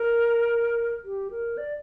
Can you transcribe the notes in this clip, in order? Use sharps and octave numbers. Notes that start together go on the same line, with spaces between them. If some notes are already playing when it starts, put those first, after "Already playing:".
Already playing: A#4
G4
A#4
D5